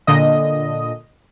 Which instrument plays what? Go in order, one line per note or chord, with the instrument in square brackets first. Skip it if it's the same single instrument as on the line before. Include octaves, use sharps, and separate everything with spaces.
[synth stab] A#2 D3 D#5